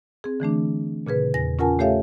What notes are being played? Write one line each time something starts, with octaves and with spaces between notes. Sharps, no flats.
C4 G#4
D3 E3 A3 D4
A#2 C#3 G#4 B4
E2 A#6
C#4 F4 A#4 F#5 G#5 A5
A3 G4 A4 C#5 E5 F5